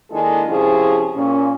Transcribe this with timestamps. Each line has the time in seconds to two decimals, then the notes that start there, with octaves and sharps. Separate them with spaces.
0.11 D#3 G#3 A#3 D4 E4 A4
0.49 C3 F3 C4 C#4 E4 G#4
1.15 A#2 C#4